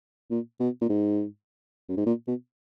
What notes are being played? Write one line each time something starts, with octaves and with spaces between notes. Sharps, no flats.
A#2
B2
A#2
G#2
F#2
G#2
A#2
B2